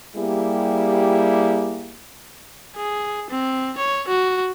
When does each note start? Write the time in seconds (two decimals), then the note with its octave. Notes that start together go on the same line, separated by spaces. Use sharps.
0.16 G3 A#3 E4 G4 G#4
2.76 G#4
3.30 C4
3.78 C#5
4.08 F#4